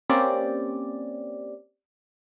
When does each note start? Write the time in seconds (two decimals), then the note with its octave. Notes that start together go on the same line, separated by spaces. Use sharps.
0.10 A#3 C4 C#4 G4 D5